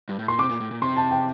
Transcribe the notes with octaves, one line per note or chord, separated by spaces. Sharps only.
G2
A2
A#2 C6
C3 D6
A#2
A2
A#2
C3 C6
A5
G5